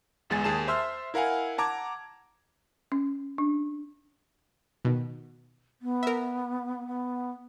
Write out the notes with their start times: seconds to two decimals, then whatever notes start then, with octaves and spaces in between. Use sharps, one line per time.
0.30 G1 E2 G#3 G#5 A6
0.44 D#2 G#4 A5 E7
0.68 C5 E5 C6 E6 F6
1.14 E4 A#4 F5 F#5 G#5
1.58 F#5 A5 A#5 D6 G#6
2.92 C#4
3.38 D4
4.85 B2 D#3
5.82 B3
6.03 A#4 E5
6.87 B3